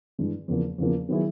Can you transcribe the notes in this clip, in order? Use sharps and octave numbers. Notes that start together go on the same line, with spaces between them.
G2 E3 G#3
E2 C#3 F3 A#3
E2 C#3 F3 A#3
D#3 F#3 B3 E4 G#4